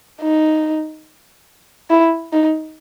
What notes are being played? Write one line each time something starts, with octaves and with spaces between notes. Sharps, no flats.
D#4
E4
D#4